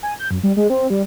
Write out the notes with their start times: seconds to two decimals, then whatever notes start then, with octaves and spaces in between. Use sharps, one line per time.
0.03 G#5
0.19 G6
0.31 F#2
0.43 G3
0.56 G#3
0.70 C4
0.90 G3